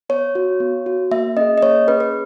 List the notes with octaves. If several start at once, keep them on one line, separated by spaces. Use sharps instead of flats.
B3 C#5
F#4
B3
F#4
A#3 E5
C#4 G#4 D#5
D#5
A#3 C#5
C#4 G#4 B4
B4